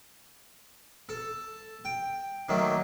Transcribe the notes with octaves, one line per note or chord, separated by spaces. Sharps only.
A4
G5
D#3 F#3 A3 A#3